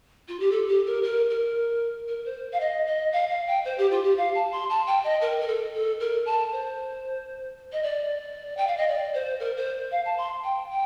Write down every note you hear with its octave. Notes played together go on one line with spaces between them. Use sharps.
F4
G4
A4
G4
A#4
A#4
A#4
A#4
C5
F5
D#5
D#5
F5
F5
G5
C5
G4
F4
G4
F5
A5
C6
A5
G5
D#5
A#4
A#4
A4
A4
A#4
A5
C5
D#5
D5
G5
F5
D#5
D5
C5
A#4
C5
F5
A5
C6
G5
G5